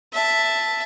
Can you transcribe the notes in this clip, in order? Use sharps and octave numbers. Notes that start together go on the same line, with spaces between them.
E5 A5